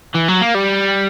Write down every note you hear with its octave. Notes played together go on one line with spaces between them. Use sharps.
E3
F#3
A#3
G3